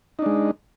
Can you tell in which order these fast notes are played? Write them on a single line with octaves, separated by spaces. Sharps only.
D#4 D4 G#3